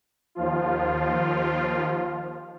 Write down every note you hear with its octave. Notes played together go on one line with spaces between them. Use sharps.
D#2 F3 F4